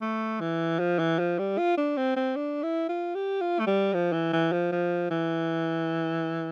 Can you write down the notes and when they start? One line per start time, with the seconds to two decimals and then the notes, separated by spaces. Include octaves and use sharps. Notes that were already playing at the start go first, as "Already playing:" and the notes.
0.01 A3
0.40 E3
0.79 F3
0.99 E3
1.19 F3
1.39 G3
1.58 F4
1.77 D4
1.97 C4
2.16 C4
2.36 D4
2.63 E4
2.89 F4
3.15 G4
3.40 F4
3.59 A3
3.67 G3
3.93 F3
4.12 E3
4.33 E3
4.52 F3
4.72 F3
5.11 E3